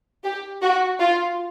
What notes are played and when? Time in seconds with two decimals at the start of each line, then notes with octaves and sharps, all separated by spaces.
0.24 G4
0.62 F#4
1.00 F4